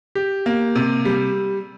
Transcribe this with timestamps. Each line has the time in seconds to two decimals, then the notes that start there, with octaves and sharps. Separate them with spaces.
0.15 G4
0.46 A#3
0.75 C3
1.05 G3